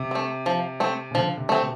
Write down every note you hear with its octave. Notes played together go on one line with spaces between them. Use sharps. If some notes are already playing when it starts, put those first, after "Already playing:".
Already playing: C3
A3 C4
F3
A3 C4
C#3
D3 F3
C3
A3 C4
B2